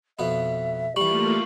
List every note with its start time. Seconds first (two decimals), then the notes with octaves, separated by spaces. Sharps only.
0.19 F2 B2 B3 E5
0.96 E3 G3 A3 A#3 F4 G4 C#6 F#7